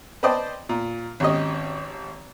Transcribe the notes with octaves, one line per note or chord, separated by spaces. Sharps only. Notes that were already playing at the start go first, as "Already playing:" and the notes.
B4 C5 D5 D#5 G5 A5
A#2
G#1 D#2 C#4 G4 D#5